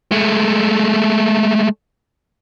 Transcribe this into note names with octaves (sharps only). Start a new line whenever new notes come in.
G#3 A3